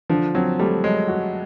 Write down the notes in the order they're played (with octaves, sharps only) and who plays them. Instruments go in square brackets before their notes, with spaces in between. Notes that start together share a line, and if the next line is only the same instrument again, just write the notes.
[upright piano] D3 [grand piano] F3
[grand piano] F#3 [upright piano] C4
[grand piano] G3 [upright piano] A3
[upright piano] F#3 [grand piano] G#3
[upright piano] F#4